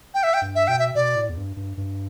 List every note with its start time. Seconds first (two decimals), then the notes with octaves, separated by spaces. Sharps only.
0.14 G5
0.23 E5
0.33 G5
0.42 G2
0.55 E5
0.67 B2 G5
0.79 E5
0.95 B2 D5
1.16 A2
1.29 E2
1.37 G2
1.57 G2
1.77 G2